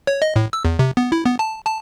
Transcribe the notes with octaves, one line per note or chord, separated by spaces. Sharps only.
C#5
D#5
A2
E6
E2
C3
B3
E4
B3
A5
A5